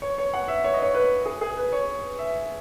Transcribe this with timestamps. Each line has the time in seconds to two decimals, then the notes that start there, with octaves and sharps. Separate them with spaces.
0.02 C#5
0.18 C#5
0.34 F#5
0.48 E5
0.64 C#5
0.74 D#5
0.82 C#5
0.94 B4
1.26 G#4
1.41 G#4
1.57 B4
1.73 C#5
2.19 E5